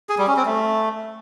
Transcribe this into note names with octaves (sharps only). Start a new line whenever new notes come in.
G#4
G3
C#4
C4
A3